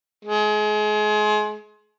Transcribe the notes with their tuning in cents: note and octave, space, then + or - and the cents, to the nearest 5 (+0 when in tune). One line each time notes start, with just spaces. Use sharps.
G#3 +30